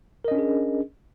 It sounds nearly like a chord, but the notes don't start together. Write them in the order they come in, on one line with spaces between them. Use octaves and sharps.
A#4 D#5 C#4 D4 G#4